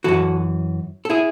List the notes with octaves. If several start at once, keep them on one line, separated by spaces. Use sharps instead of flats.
F#2 C#3 E3 F#4 A4
A4
E4 G#4